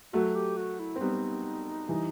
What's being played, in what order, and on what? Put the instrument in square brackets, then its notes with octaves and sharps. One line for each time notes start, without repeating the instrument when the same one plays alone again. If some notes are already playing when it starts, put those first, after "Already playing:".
[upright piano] F#3 A3 [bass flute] F#4
[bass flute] G4
F#4
E4
[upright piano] C4
[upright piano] G3 B3 [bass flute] D#4
[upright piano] E3 G3